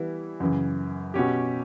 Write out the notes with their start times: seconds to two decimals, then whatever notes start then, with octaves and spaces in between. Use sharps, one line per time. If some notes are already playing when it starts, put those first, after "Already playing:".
Already playing: E3 G3 B3 E4 B4
0.40 F#2 C#3 E3
1.14 B2 F#3 C#4 G4